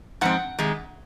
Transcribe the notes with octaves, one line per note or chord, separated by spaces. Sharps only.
G#2 F3 C4 F#5
C3 D#3 G#3